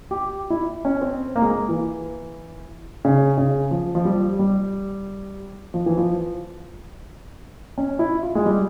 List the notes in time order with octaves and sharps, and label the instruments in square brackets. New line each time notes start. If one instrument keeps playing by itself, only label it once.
[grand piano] G4
E4
C#4
C4
A#3
G#3
A#3
E3
C#3
C#3
F3
F3
G3
G3
F3
E3
F3
C#4
E4
F4
G#3
G3